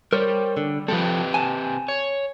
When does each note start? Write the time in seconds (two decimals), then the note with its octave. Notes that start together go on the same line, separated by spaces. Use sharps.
0.13 G3 A#4 C5 C#5
0.57 D3
0.88 F3 C4 G4 A4 B4
1.34 G#5 A5
1.88 C#5